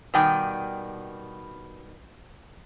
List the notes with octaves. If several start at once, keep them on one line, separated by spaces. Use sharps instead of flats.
B2 D#3 G3 G5 G#5